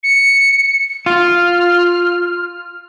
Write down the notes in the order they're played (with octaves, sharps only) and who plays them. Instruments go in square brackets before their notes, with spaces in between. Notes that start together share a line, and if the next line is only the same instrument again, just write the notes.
[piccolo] C#7
[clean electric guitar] F4 [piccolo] F6